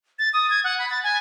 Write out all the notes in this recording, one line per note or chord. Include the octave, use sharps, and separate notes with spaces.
A6
D#6
G#6
F#5
B5
A6
G#5